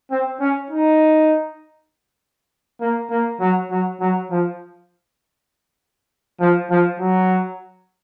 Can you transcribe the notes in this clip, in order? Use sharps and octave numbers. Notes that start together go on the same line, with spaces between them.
C4
C#4
D#4
A#3
A#3
F#3
F#3
F#3
F3
F3
F3
F#3